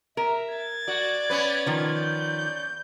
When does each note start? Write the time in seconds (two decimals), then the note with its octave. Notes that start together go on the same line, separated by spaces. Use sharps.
0.17 A#4 E5
0.53 G#6 A6
0.88 F#4 D5
1.30 B3 C#4 B4
1.66 D#3 F3 D5
1.99 G6